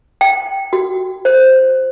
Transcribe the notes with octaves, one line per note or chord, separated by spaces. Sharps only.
G5
F#4
C5